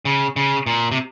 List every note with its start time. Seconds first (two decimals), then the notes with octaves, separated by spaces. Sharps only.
0.05 C#3
0.36 C#3
0.66 A#2
0.92 C3